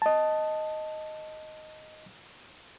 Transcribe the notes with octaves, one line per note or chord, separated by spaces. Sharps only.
D#5 A5